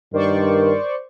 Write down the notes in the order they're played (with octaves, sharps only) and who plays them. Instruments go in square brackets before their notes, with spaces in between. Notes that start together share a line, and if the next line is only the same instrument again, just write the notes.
[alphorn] G2 [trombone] D#3 [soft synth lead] A#4 [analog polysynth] C5 D5 C#6